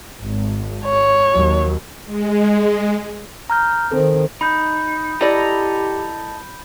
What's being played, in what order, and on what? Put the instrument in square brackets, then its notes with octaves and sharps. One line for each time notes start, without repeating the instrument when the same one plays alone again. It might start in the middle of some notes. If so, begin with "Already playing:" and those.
[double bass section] G#1
[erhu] C#5
[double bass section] D#2 F#3
[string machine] G#3
[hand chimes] A#5 F6 G6
[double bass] D#3 C4 [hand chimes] A4
[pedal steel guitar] D#4 [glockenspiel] B5 G6
[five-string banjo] E4 D5 [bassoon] G4 [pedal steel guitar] A4 D#5 A#5